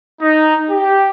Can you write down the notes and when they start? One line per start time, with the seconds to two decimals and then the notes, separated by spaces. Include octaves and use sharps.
0.21 D#4
0.70 G4